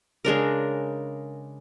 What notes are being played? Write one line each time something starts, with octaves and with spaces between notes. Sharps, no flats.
C#3 G#3 D4 A#4